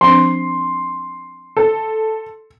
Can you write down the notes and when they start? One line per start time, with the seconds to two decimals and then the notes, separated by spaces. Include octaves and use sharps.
0.01 F3 C4 D4 C6
1.57 A4